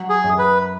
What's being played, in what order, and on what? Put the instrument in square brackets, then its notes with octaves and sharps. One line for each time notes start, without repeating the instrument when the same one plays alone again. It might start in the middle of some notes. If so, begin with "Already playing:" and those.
Already playing: [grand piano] F#3
[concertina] G#4
[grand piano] F#2
[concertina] B4